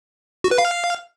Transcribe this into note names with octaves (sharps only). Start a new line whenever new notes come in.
F#4
B4
F5